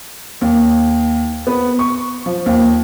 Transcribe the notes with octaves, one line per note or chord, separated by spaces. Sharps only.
D#2
B3
C#6
F3
D#2